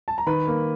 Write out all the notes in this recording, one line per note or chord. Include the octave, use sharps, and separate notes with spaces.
A5
A#5
D#3 B4 B5
A#3